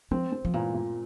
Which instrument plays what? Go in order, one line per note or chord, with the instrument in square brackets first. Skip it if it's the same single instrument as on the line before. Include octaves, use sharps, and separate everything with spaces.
[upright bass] F3 [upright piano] C4
[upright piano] C4
[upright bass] F3
[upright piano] A#2 [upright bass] E3
[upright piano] A#2